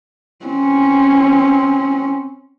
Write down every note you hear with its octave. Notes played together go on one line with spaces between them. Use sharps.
C4 C#4